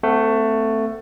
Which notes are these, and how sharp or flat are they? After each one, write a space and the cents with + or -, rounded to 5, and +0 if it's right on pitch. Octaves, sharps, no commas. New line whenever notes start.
A3 +15 C4 -25 F#5 +0